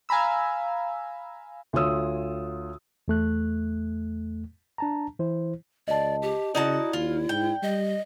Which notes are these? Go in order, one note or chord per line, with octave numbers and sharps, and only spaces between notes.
F5 G#5 A#5 B5 E6
D2 F4 C#5 D#6 E6
E2 A3 F#6
D4 A5 A#5
E3 E4 C5
C#2 D5 D#5 A5
G4
C#3 D#4 E4 F#4 D5 A5
D#2 F4
G#2 G5
G3 D#5